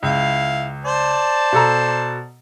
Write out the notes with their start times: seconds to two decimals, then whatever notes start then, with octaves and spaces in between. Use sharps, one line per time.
0.03 C#2 E4 F5
0.85 C5 D5 A5
1.53 B2 A4 A#5